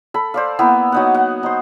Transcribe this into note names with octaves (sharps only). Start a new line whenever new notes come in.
A4 B5
C5 D5 F5
A#3 B3 E4
F#3 D#4 F#5
F#5
D#4 C5